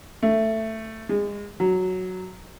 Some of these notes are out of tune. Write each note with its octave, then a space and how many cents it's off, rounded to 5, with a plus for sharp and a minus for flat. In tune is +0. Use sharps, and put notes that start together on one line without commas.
A3 +10
G#3 -30
F#3 +0